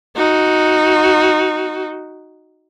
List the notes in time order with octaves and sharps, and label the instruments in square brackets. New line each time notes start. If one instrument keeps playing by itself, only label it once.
[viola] D#4 F#4